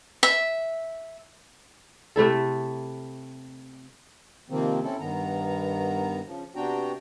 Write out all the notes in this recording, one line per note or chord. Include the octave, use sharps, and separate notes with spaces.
E5
C3 A3 E4 A4
C3 D#3 F3 A#3 C4
C4 C#4 E4 A4
G2 D#3 B3 A#5
C#3 F3
C3 B3 D4 F#4 G5 A#5